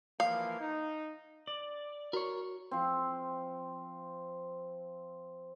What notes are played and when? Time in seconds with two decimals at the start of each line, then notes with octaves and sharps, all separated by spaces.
0.20 E3 F3 A#3 F5
0.61 D#4
1.47 D5
2.13 F#4 A#4 C#5
2.71 F3 C4